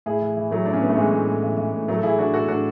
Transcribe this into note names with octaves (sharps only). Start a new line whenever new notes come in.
A2 E4 G#4
E3
E3
A2 F#3 A3
A2 D4
C#4
E3 B3
A3
E3 G#3
A2
A2
E3
E3
A2
A2 F#3 A3
A4
E3 E4 G#4
E3 D4 F#4
A2 F#4 A4
A2 D4 F#4